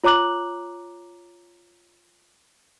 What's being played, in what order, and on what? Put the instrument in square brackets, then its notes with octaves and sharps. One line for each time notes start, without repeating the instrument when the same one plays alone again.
[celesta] F4 C#5 A#5 D6 F#6 F#7